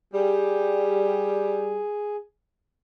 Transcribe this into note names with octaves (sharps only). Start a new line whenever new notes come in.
G3 G#4